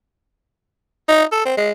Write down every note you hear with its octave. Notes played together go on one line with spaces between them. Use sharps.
D#4
A4
C4
G#3